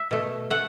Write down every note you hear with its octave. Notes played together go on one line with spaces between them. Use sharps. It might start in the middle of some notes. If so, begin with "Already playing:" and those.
Already playing: E5
B2 A3
A3 F#5